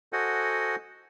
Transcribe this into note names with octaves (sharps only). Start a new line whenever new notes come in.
F#4 A4 C5 D#5 F#5 G#5